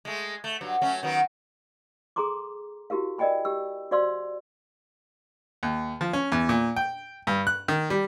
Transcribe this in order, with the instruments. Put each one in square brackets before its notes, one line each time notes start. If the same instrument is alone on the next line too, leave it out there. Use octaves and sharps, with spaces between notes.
[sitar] G#3 A3
A3
G2 F#3
F#3 A3 C#4
D#3 F#3 B3
[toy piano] G#4 A4 A#5 C6 D6
E4 F#4 G4 A#4 F5
A#4 D5 D#5 G5 G#5 B5
G4 E6
F#4 C5 D5 F5 C6 E6
[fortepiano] D#2
F3
C#4
E2
A#2
G5
G2
F#6
D#3
G3